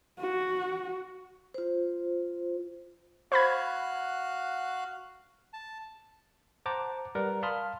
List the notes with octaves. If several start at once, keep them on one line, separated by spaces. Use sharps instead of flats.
F#4
F4 C5
F#4 C5 F5 B5 F#6 G#6
A5
C5 F#5 A5 A#5 D6
G3 A#4 B4 D5 F#5
F5 A5 B5 C6 D#6 F6